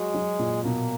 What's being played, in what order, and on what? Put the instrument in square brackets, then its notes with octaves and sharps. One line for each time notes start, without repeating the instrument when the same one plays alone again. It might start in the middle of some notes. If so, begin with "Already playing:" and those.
Already playing: [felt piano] F#3 F#4 [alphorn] G#3
[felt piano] F#3
A#2
[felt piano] B2 [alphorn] A#3